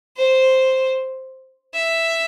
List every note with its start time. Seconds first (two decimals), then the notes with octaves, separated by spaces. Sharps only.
0.17 C5
1.74 E5